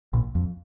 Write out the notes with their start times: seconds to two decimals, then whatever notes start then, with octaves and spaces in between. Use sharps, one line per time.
0.13 A#1 A#2
0.35 F2